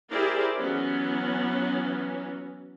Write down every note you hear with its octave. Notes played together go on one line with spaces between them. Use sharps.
E4 G4 G#4 A#4 C5 D5
E3 F#3 B3 C#4